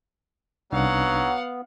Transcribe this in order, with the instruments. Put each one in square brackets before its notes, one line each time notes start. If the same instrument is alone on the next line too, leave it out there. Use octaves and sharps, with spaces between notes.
[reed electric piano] C2 D4 D#4 [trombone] F#3 [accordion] B3 [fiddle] F5 F#5